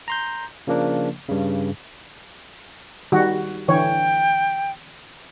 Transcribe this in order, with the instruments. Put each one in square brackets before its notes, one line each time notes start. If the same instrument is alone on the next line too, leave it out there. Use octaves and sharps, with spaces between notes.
[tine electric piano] A#5 C6 G6
C#3 F3 A#3 D4
G2 C#3
[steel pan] D#3 G3 F#4
[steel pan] D3 E3 C#5 [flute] G5